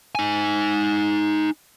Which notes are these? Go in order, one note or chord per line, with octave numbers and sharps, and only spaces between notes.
D#4 G#5